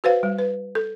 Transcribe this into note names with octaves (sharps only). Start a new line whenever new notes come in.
F#4 B4 C5 F5
G3
B4
A4